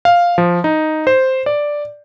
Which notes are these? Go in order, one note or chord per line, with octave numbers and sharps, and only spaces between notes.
F5
F3
D#4
C5
D5